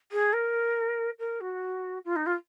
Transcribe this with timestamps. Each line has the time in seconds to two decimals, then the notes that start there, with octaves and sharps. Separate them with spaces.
0.12 G#4
0.33 A#4
1.19 A#4
1.41 F#4
2.05 F4
2.16 D#4
2.26 F4